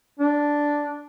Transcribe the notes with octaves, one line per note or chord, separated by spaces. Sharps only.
D4